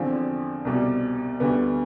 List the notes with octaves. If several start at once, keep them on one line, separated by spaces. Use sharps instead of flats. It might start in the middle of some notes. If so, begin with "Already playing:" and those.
Already playing: E2 D3 F3 C4
C2 B2 G3
D2 D3 G3 B3